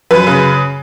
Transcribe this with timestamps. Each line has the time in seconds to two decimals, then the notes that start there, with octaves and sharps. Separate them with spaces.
0.11 F#2 B4
0.27 C#3